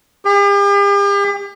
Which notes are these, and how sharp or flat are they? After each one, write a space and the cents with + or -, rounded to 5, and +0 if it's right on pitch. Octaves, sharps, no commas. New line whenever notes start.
G4 +45